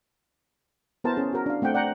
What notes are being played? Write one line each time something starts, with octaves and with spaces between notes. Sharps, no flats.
B3 E4 A#4 C5 A5
C#4 G#4
F#4 A#4
D4 F5
A3 C4 F#5 G5
D5 F#5 G5 A#5